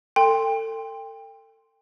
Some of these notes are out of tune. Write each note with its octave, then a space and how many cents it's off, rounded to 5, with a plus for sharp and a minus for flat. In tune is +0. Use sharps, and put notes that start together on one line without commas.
A4 +30 G5 +25 C6 +0